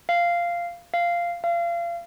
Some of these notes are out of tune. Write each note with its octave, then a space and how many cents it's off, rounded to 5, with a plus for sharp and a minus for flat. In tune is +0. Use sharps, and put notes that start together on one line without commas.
F5 -10
F5 -10
F5 -30